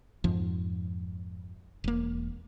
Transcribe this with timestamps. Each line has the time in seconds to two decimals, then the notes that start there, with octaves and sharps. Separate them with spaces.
0.24 F2 G#2 F3
1.84 E1 A#3